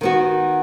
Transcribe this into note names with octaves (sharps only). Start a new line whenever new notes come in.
D#3 B3 F#4